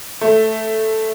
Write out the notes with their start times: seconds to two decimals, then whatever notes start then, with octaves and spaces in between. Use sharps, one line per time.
0.21 A3